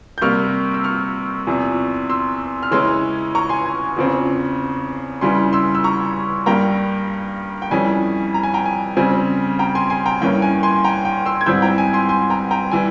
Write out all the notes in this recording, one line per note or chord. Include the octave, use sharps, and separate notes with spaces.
G6
C3 G3 A#3 C#6 F6
E6
C#6 F6
E2 C3 F3
C6 E6
F6
C#3 E3 G#3 C#4 C6 E6
A#5 C#6
G#5 C6
G#5
E2 C#3 F3 C4
C#3 E3 G3 G#5 C6
C6 E6
E6
A#5 C#6
G2 G3 A#3 G5 A#5
G5
F2 E3 G3 C#4 G#5
A#5
G#5
G5 A#5
G#5
C#3 G3 C4 G#5
G5 A#5
G#5 C6
G#5 C6
G5 A#5
G2 E3 A#3 C#4 G5
G#5
G#5 C6
G5 A#5
G5
C6 E6
G#6
G#2 E3 G3 C4 E6 G6
G5 A#5
G#5
G#5 C6
G#5 C6
G5 A#5
G5 A#5
E3 G3 G#5